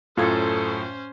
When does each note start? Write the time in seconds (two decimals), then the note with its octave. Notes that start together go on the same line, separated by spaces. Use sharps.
0.17 F#2 A2 C#4 F4 A4 C5 G#6